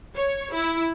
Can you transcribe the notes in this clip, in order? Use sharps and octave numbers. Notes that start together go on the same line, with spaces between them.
C#5
E4